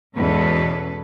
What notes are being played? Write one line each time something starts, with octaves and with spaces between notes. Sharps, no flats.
E2 G#2 B2 C#4 A4 B4